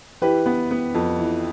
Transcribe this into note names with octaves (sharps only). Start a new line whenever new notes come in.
E3 G4 B4
B3
B3
F2
E3